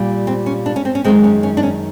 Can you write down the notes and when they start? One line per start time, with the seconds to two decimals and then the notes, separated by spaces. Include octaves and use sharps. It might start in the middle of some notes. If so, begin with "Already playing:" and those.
Already playing: A#2 G3
0.27 C4
0.46 C#4
0.66 D4
0.76 C#4
0.85 C4
0.95 C#4
1.04 F#2 D#3 G#3 C4
1.24 C#4
1.43 C#4
1.57 D4
1.63 C#4